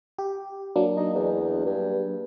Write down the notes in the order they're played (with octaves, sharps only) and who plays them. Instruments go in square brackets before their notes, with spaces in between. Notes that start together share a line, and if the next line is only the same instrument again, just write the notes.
[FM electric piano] G4
F#3 A#3 D4
[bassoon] D#4
E2
G2